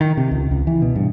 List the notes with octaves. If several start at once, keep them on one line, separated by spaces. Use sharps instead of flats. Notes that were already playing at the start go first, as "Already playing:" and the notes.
D#3
C3
C#2
C#2
E3
B2
G2